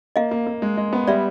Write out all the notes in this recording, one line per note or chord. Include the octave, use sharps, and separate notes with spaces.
A#3 D#5 F5
A#3
A#3
G#3
G#3
B3
G3 D5 E5